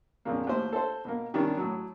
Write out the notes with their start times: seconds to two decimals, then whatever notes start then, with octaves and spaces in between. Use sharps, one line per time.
0.25 F2 A#2 C#3 A#3
0.47 D#2 A2 C5
0.73 A4 C5
1.05 B2 A#3
1.34 C3 D#3 G3 C#4 D4
1.57 A2 F#3